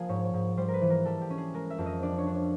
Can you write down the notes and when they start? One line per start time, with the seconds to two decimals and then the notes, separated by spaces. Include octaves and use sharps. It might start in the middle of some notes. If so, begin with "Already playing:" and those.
Already playing: F3 A#3 G#4
0.09 G#2 C#5
0.25 C#5
0.34 G#2
0.57 G3 C5
0.68 A#4
0.74 B4
0.81 E3
0.90 A#4
1.05 G3 A4
1.21 G4
1.30 C#4
1.38 G#4
1.54 G#3 A#4
1.70 E5
1.78 F2
1.86 D#5
2.03 D4 D5
2.18 C#5
2.26 D4
2.35 C#5